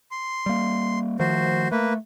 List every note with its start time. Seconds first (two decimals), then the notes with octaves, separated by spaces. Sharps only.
0.11 C6
0.46 G3 A#3
1.19 D#3 F3 A3 F#4 C5
1.71 A3 A#3 B4